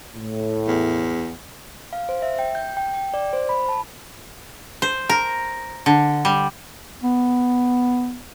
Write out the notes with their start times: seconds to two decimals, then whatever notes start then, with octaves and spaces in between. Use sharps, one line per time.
0.15 A2
0.68 E2
1.93 F5
2.09 C5
2.22 E5
2.39 G5
2.55 G6
2.77 G5
2.94 G5
3.14 D5
3.33 C5
3.49 B5
3.69 A5
4.82 C5
5.09 A#4
5.86 D3
6.25 G3
7.04 B3